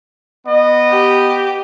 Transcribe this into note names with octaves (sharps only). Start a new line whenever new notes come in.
B3 D#5
G4